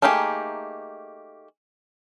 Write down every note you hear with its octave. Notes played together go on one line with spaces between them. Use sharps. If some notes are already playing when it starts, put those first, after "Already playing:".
A3 A#3 D#4 G4 G#4